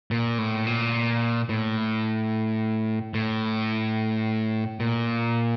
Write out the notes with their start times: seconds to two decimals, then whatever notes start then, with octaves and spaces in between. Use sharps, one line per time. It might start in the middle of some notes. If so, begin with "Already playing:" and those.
0.11 A#2
0.38 A2
0.67 A#2
1.49 A2
3.14 A2
4.80 A#2